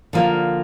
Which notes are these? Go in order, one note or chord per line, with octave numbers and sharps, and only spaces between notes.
D3 F3 A#3